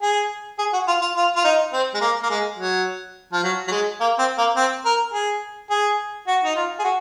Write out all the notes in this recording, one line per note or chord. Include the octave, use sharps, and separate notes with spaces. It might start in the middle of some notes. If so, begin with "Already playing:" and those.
G#4
G#4
F#4
F4
F4
F4
F4
D#4
C4
G#3
A#3
A#3
G#3
F#3
F3
F#3
F#3
G#3
A#3
C4
A#3
C4
A#4
G#4
G#4
F#4
D#4
F4
G#4
F#4